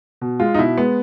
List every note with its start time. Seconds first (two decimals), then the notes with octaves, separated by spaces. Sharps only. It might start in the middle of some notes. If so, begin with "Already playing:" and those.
0.21 B2
0.40 G#3 F4
0.54 D#4
0.58 B2 E4
0.77 G#3 B3